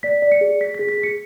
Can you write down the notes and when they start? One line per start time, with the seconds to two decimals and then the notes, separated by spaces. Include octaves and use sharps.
0.03 D5 B6
0.22 D5
0.32 C#7
0.41 G#4
0.61 G#4 B6
0.74 G#4 B6
0.89 B6
0.98 G#4
1.03 C#7